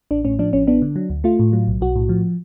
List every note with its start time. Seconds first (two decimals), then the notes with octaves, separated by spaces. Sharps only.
0.11 A1 D4
0.25 A2 C#4
0.39 F3 D4
0.53 A1 C#4
0.67 B3 D4
0.82 D3
0.96 F#3
1.10 D2
1.24 A3 F4
1.39 A2
1.53 F#3
1.68 B1
1.81 B1 F#4
1.96 A2
2.09 F3